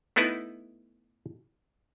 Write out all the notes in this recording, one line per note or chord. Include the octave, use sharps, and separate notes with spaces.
A3 B3 D#4 E4 B4